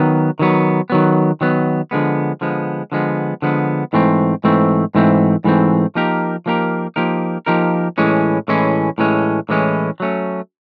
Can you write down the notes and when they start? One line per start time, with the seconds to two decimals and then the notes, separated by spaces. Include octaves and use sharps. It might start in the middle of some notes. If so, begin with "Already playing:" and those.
Already playing: D#3 F#3 B3
0.39 D#3 F#3 B3
0.90 D#3 F#3 B3
1.41 D#3 F#3 B3
1.91 D3 F3 G#3 B3
2.41 D3 F3 G#3 B3
2.92 D3 F3 G#3 B3
3.42 D3 F3 G#3 B3
3.93 G#2 E3 A3 C4
4.44 G#2 E3 A3 C4
4.95 G#2 E3 A3 C4
5.44 G#2 E3 A3 C4
5.95 F3 A#3 D#4 G4 A#4
6.46 F3 A#3 D#4 G4 A#4
6.96 F3 A#3 D#4 G4 A#4
7.46 F3 A#3 D#4 G4 A#4
7.98 A2 E3 G#3 C#4
8.48 A2 E3 G#3 C#4
8.98 A2 E3 G#3 C#4
9.49 A2 E3 G#3 C#4
10.00 F#3 A3 C#4